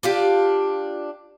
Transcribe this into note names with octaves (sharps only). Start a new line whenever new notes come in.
D4 F4 G4